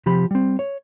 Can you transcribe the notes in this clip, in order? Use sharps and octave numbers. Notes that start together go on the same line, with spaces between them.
C3 F3 G4 B5
G3 C4
C#5